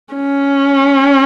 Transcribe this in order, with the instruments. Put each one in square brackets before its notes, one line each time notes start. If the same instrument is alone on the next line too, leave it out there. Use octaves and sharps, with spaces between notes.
[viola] C#4